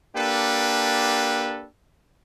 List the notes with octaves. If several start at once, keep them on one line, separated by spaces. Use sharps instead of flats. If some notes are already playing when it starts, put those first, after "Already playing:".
A#3 D4 G4 A4 B4